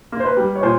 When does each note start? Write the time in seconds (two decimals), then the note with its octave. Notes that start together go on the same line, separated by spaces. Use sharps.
0.12 A#3
0.20 C5
0.25 B4
0.37 G3
0.56 C#5
0.63 A#2 C5